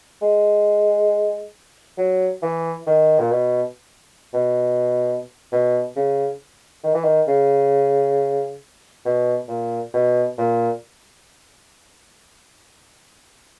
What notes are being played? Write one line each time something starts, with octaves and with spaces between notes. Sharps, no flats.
G#3
F#3
E3
D#3
A#2
B2
B2
B2
C#3
D#3
E3
D#3
C#3
B2
A#2
B2
A#2